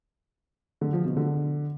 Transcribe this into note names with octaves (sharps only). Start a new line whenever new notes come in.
D3
F3
B2
D3